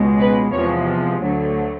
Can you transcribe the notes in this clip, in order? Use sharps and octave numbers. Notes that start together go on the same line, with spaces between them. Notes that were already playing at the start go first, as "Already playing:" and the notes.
Already playing: C#2 B2 G#3
B4
E2 C3 F3 G#3 C#5
D2 D3 F#3 A3